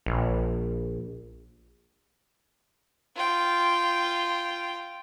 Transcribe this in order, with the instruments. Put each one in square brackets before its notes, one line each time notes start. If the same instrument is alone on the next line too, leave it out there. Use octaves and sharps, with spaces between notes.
[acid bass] A#1
[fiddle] F4 G5